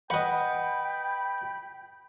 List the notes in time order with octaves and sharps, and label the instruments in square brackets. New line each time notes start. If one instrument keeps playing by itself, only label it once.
[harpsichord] B4 D#5 [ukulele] F#5 [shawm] G5 [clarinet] B5